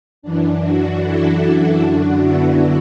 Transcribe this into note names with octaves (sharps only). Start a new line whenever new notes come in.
F#2 E3 D4
D4 F#4
E4 A4
D4 F#4
F#2 D3 D4 F#4
B3 E4